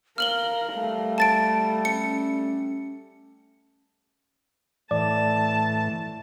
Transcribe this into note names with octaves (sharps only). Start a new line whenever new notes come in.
A#4 F5 F6 F#7 G7
G3 A3
A5 A6 D7
C#4 C#7
A2 E3 D5 A5